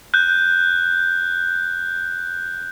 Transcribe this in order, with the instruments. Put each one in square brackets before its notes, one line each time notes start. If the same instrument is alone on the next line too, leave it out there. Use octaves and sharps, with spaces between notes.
[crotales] F#6 G6